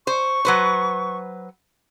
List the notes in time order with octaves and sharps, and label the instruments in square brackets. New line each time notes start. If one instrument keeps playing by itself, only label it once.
[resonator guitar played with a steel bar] C5 [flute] C#6
[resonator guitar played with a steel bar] F#3 B4 C5